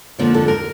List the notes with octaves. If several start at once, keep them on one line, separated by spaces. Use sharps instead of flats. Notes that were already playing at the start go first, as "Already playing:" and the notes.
F2 D3 F3 A#3
A4
A#4